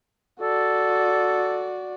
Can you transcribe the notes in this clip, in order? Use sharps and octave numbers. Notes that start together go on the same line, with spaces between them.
F#4 A4 D5